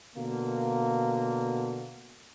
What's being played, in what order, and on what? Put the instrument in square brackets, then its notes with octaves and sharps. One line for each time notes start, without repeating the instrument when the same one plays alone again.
[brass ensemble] B2 D3 A#3